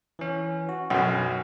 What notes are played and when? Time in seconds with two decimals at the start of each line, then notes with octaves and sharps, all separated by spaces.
0.19 E3 C#4
0.69 F#4
0.90 B1 F#2 C#4